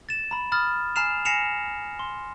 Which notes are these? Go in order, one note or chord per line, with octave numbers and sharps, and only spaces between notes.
A6 E7
A#5 B5
B5 D#6 F6 A6
G#5 A#5 F6 C7 E7 F7
G#5 A#6 C7 C#7 E7 F7
C6